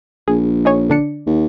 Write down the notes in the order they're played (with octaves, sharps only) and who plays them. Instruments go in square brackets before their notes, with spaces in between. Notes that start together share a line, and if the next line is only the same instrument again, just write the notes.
[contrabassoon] A#1 [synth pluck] G#4
[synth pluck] D#4 G#4 C#5
D3 D4 C#7
[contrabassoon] D#2